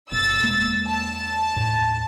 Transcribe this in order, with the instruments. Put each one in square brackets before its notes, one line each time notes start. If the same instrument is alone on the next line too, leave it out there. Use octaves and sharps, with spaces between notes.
[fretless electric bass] F#1 B2 [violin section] E6 A6
[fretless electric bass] E2 G#3 A#3
[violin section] A5
[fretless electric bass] D#2 A2